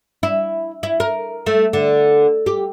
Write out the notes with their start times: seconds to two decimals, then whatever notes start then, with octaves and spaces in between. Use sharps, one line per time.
0.23 E4
0.83 E4
1.00 A#4
1.46 A3
1.73 D3
2.46 G4